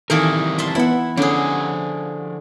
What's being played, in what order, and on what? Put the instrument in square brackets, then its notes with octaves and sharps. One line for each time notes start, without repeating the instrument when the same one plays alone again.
[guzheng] D#3 E3 A#3 [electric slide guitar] C4 G4 A#4 [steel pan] A4
[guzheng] E5 A5 C6
[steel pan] E3 B3 [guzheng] E4 F#5
[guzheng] D3 G#4 [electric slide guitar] F3 F#5 [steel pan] C#4